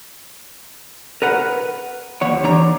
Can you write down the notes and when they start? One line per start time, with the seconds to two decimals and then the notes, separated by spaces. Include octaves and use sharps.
1.22 A#4 B4 F#5
2.21 D#2 C#5 F#5
2.43 E3 D4 C#5 A#5